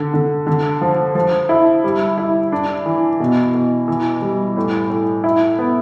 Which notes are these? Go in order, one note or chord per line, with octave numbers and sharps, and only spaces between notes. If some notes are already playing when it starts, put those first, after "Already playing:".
Already playing: D3
D3
D3
F3
F3
E4
G3
E4
D4
E3
B2
B2
E3
G3
A2
A2
E4
B3